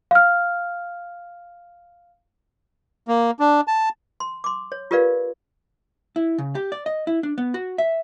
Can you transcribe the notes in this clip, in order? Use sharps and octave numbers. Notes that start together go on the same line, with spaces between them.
F5 F6
A#3
D4
A5
C6
C6 D6
C#5
F4 G4 A#4 B4 D5 F5
E4
C#3
G4
D5
D#5
E4
D4
B3
F#4
E5